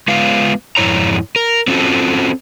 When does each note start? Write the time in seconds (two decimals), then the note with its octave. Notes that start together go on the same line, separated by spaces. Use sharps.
0.08 G#3 B3 F4 F5
0.77 F2 G#2 D#3 E4 C#5 A#5
1.36 A#4
1.68 C4 C#4 F4 F#4 A4